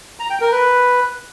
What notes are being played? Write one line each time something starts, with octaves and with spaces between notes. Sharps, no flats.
A#5
G5
A#4
B4